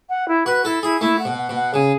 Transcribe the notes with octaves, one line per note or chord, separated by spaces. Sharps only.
F#5
E4
F#4 B4
E4 A4
E4 G#4
A3 E4
F#5
B2
F#5
B2
F#5
C#3 G#4